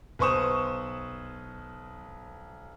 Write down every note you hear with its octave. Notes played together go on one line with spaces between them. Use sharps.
B1 B4 C5 C#6 D#6 E7